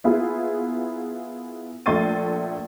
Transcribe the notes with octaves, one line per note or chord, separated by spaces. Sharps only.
A#3 B3 E4 F4 G#4
A#1 A3 C6 A6 D#7